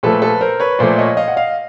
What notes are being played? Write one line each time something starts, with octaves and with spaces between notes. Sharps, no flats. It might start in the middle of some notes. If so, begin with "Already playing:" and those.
A#2 F3 A3 A4 B4
A4 B4
A#4 C5
B4 C#5
A#2 F3 A3 C5 D5
C#5 D#5
D#5 F5
F#5
D#5 F5